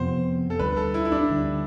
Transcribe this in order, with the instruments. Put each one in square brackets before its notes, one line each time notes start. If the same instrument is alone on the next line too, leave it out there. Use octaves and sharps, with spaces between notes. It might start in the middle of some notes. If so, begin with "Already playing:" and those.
Already playing: [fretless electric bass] F2 C3 F3 B3 [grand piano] C4 C5
[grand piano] A4
[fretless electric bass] D2 D3 G3 [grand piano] B4
[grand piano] A4
E4
E4
D4
[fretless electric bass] D2 D3 G3